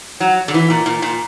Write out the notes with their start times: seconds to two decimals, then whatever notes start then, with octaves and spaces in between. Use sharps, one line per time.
0.20 F#3
0.48 D3
0.54 E3
0.70 A#2
0.86 A#2
1.02 A#2